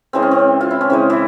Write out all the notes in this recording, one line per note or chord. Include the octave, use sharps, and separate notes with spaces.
C#3 E3 G#3 C4
C#4
C4
F4
E4
C#4
C#3 E3 G#3 C4
E3 E4